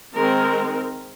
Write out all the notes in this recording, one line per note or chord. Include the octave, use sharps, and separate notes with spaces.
D#3 G#3 C4 A#4